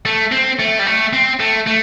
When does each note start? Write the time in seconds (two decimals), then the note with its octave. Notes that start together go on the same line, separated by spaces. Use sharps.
0.06 A3
0.32 C4
0.60 A3
0.79 G3
0.87 A3
1.13 C4
1.40 A3
1.67 A3